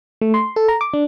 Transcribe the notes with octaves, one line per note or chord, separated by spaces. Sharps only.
A3
C6
A4
A#5
D6
D4